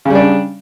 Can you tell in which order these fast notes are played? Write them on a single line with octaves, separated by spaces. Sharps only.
C#3 G3 D4